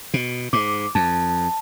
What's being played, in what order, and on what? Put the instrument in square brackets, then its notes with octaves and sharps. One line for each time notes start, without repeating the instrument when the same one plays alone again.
[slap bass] B2
[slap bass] G#2 [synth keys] D6
[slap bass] F2 [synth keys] A5